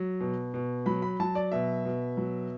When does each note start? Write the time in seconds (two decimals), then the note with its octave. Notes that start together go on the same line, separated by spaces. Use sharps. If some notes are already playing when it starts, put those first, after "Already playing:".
Already playing: F#3
0.20 B2
0.54 B2
0.86 F#3 B5
1.02 B5
1.20 F#3 A5
1.35 D5
1.52 B2 E5
1.85 B2
2.17 F#3